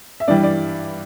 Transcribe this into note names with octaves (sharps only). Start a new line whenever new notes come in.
E5
G2 E3 G3 D5
D5